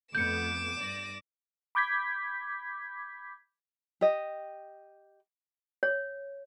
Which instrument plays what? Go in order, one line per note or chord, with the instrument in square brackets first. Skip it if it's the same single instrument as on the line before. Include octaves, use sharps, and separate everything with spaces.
[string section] F2 A3 B3 [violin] D6 E7 [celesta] G6 C#7
[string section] G2 D5 A#6
[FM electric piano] B5 D6 G6 G#6 B6
[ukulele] G4 D#5
[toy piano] C#5